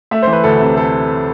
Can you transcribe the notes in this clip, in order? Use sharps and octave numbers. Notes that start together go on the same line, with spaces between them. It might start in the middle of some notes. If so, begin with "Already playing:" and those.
A3 E5
C5
E3
B4
D2 A4
C3
A4